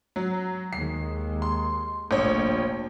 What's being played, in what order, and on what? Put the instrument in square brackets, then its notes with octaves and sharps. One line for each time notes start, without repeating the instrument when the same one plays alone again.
[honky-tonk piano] F#3
[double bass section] D#2 D#3 G#3 [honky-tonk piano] C7
[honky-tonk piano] C6
[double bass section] F1 A#2 A3 [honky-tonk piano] A#1 C#5